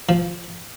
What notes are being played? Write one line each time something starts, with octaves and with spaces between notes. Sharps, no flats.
F3